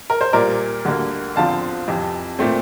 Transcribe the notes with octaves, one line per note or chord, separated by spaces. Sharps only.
A#4
C5
A#2 G3 A#3 A#4 D5
D2 D3 G3 A#3
E2 D3 F3 C4 F5 A5
F2 C3 E3
A#2 A3 C4